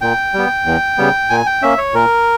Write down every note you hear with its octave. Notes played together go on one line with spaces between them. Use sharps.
A#2 G5
G3 B3
E2
C#3 G3 B3
A#2 G#5
G5
A#3 C#4 E5
C#5
A#2 A#4